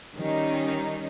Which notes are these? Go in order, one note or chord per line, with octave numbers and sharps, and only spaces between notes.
D#3 G3 C#4 D#4